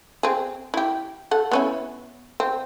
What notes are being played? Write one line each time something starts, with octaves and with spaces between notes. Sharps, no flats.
C4 G#4
E4 G4
A4 F#5
B3 C#4 E4
C4